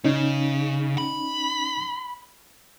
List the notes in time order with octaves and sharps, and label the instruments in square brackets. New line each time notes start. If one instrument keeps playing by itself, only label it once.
[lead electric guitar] C#3 [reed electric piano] C#4 D#4
[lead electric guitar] B5